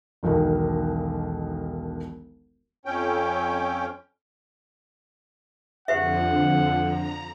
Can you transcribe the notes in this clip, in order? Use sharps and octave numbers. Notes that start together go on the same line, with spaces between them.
E1 B1 B2 D#3
F2 C#4 G5
F2 D3 F3 G4 B4 E5 F#5
A#5